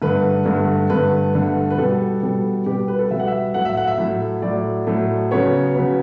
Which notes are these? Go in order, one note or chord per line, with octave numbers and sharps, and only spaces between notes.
G2 D3 A3 B4
G2 D3 A3
G2 D3 A3 B4
G2 D3 A3
B4
B2 G3 B3 A4
B2 G3 B3
B2 G3 B3 G4
B4
A4
B2 G3 B3 E5
F#5
E5
A2 F#3 A3 F#5
E5
F#5
E5
A2 F#3 A3
A2 F#3 A3 D5
A2 F#3 A3
C#3 F#3 B3 C#5
C#3 F#3 B3